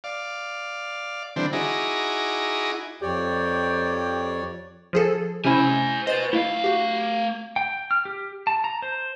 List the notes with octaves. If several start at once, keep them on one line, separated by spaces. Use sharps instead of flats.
D5 F5
D3 E3 G3 C4 D4
D#4 E4 F#4 G#4 A#5 D6
F2 G4 C#5 D5 G5
F3 G#4 A4
C3 C#4 E4 C5 G#5
B4 C5 D#5 A6
A3 E4 F5
F#4 G4
G5
F6
G4
A5
A#5
C5